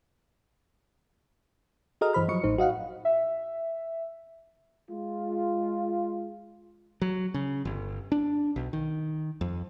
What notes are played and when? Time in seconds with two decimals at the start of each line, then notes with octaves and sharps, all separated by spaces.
2.01 F#4 G#4 A4 D#5 A#5 F6
2.13 G2 E3 C5 B5 F6
2.28 F3 F#3 D#5 C#6 C#7
2.44 A1 A2 D#4 C5
2.58 F#4 D#5 F5 F#5
3.05 E5
4.88 G#3 F4
7.02 F#3
7.34 C#3
7.65 G1
8.12 D4
8.56 B1
8.73 D#3
9.41 F2